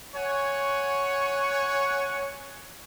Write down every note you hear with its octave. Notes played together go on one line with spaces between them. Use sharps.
C#5 F#5 G#5 C#6